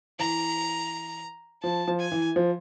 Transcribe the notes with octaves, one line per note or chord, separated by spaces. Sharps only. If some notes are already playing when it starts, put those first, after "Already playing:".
E3 A#5
F3 A5
F3
G#5
E3
F3